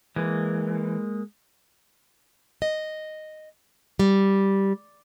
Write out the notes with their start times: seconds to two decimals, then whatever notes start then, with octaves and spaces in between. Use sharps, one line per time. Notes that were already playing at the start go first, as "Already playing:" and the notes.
0.16 E3 G#3 A#3
2.62 D#5
3.99 G3